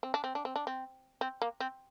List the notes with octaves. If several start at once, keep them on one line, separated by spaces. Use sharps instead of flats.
C4
D4
C4
D4
C4
D4
C4
C4
A#3
C4